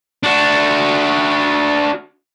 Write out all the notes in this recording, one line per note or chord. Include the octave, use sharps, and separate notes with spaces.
D4 F#4